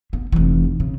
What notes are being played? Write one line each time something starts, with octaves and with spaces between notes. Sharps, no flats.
B3
F1 E3
C#3